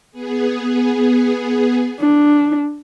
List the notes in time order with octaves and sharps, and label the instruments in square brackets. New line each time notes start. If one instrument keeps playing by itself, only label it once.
[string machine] B3 G#4
[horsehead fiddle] D4